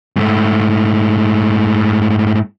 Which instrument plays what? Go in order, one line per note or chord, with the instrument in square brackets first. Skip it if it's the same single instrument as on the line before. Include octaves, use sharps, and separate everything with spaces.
[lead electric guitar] G#2 A3